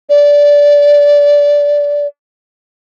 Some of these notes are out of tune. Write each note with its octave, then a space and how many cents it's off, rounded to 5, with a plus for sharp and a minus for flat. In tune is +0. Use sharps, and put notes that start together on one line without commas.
D5 -15